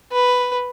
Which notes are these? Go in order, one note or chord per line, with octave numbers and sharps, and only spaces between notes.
B4